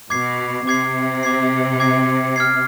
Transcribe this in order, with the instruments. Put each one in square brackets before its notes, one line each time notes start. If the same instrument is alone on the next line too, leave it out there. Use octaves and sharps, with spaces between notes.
[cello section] B2 [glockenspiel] D6 G#6 C7
[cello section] C3 [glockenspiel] D6 G#6 C7
[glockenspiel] D6 G#6 C7
D6 G#6 C7
F6 G#6 C7